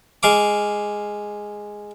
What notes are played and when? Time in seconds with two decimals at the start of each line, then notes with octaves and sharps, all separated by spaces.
0.23 G#3 F5 D6